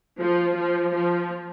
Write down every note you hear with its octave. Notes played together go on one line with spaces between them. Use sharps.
F3
F3
F3